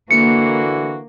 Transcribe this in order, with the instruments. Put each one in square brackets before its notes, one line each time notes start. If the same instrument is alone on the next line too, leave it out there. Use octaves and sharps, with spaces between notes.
[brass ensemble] D3 E3 F#4 [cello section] A#3 [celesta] C#7